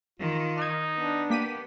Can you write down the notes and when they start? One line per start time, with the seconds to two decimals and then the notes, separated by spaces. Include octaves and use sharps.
0.19 D#3 F4
0.58 D#4 F6 G#6
0.96 B3 D4
1.30 A#3 G4 B6 D#7